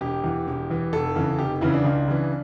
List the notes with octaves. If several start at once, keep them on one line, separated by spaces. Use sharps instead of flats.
E1 G4
E2 E3
E1
E2 E3
F1 A4
E2 C#3 E3
F1 G4
E2 C#3 E3 E4
D4
C#2
C#3 E3